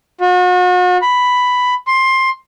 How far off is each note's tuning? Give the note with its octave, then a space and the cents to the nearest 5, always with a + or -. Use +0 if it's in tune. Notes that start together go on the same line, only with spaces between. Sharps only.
F#4 -40
B5 +5
C6 +15